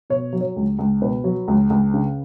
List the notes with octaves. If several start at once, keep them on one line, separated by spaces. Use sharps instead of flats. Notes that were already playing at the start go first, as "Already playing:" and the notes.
B2 C#5
F#3
C#5
C#2
C#2
B2 B4
F#3
C#2
C#2
C#3